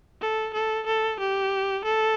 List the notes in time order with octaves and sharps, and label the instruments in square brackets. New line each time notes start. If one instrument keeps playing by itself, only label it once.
[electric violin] A4
A4
A4
G4
A4